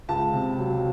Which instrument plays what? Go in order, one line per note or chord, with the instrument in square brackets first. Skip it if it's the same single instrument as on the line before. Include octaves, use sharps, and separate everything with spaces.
[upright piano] C#2 A5
C3
F#3